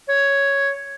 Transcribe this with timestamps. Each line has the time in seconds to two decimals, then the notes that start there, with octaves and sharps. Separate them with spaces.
0.09 C#5